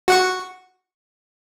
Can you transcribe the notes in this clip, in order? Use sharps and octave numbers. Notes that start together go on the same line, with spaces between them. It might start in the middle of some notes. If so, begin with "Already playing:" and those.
F#4 F#5 C#6